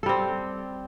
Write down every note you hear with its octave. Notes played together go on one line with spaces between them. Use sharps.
G3 C4 A4